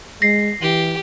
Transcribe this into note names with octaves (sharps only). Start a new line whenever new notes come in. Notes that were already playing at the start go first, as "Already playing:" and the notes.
G#3 A#6 C7
E3 G4